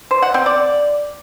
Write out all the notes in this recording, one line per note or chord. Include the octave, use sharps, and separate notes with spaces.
C5
F#5
C4
D5